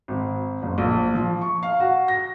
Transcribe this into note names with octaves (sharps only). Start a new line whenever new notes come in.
G#1
F#1
A#1
F3
C#6
F5
F#4
A#6